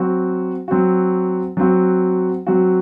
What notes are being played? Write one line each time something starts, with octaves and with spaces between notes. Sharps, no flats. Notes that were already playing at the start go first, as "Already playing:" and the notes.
Already playing: F#3 C4 F#4
F#3 C4 F#4
F#3 C4 F#4
F#3 C4 F#4